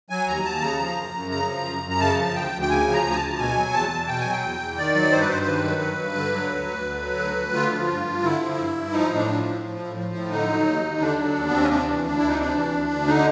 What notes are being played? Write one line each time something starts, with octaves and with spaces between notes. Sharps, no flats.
F#3 G#5
D#2 A#5
D#2 A5
C#3 A#5
F3
F#2
F#2
C#3 A#5
F3
F#2
F#2
A#5
C#3 A5
F3
D2 G5
D2
G5
C#3 G#5
F3
A#5
D2
G#5
A5
D2
B2 G#5
F#3
E2 A5
E2
B2 G5
G#5
F#3
G5
E2
E2
D#3 D5
F#3
G2 C5
B4
G2 C5
C5
D#3 B4
F#3
G2
G2
D3
F#3
D2
D2
D3
F#3
D2
D2
D3 F4
F3
G2
G2
D3 E4
F3
G2
G2
F3 D#4
A2
D4
F3
A2
F3
A2
F3
A2
D3 D#4
F#3
D#2
D#2
D3 D4
F#3
D#2
B3
D#2 C4
C#4
C3 D4
E3
D2 D4
D2 E4
D#4
C3 D4
E3
D2
D2
D3 D#4